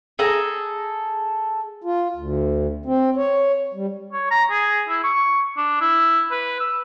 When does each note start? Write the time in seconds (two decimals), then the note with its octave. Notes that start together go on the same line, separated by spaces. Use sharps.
0.19 G#4 A4 A#5
1.84 F4
2.16 D2
2.86 C4
3.16 C#5
3.74 G3
4.13 C#5
4.31 A#5
4.51 G#4
4.89 E4
5.04 C#6
5.57 D4
5.81 E4
6.31 B4
6.60 E6